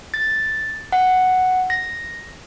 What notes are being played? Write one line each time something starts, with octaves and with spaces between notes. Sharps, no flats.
A6
F#5
A#6